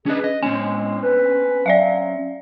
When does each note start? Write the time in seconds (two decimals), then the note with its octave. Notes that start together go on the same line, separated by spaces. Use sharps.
0.06 C#4 D4 G#4 B4 D#5
0.24 D#5
0.43 A2 G#3 C4 C#4 G#5
1.03 B4
1.66 F#3 D5 E5 F5